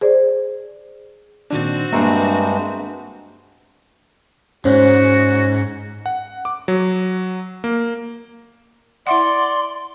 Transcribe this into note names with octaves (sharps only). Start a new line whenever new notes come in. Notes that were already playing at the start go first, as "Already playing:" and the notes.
G#4 C5 D5
A#2 D#3 C4 D4 F#4
G2 G#3 A#3 B3 D4 E5 A#5 C#6
G#2 C#4 F#4 C5 C#5
F#5
D6
F#3
A#3
E4 D5 E5 F#5 C6